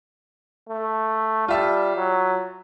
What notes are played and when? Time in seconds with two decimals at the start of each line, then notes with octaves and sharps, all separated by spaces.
0.69 A3
1.48 G3 F4 E5 A5
1.96 F#3